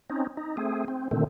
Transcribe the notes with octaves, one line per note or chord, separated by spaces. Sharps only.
C4 C#4 D#4
D#4
A3 C4 G#4
C4
A#2 D3 D#3 A3 C4